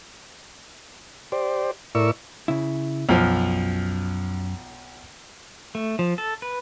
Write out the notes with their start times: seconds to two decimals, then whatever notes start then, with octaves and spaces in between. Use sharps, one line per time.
1.32 G4 C5 D5
1.95 A2 E4 A#4 D5 C#6 E6
2.48 C#3 E4
3.09 B1 F#2 F3
5.75 A3
5.99 F3
6.18 A4
6.42 B4